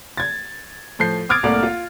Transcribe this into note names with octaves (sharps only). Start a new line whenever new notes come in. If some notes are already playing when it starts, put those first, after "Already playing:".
G#6 A6
A2 F3 G6 C7
D6 D#6 F6 G#6 A6 D7
C2 A2 A#3 D5 D6
F4